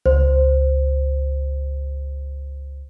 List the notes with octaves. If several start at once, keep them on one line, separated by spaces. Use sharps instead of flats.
C#2 C5